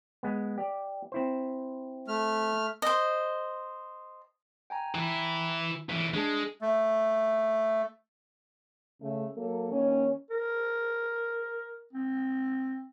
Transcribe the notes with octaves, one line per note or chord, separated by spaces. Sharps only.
G#3 B3
G4 D5
C4 E4 C5
A3 F6
C5 D#5
G5 G#5 A#5
E3 E4
B1 E3 B6
G#3 D4 G#4 A5
A3
C#3 A3
F#3 A#3 A4
D#3 A#3 C#4
A#4
C4